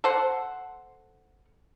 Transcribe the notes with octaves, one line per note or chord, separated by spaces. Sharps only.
A4 C5 F#5